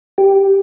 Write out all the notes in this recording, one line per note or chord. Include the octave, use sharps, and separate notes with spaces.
G4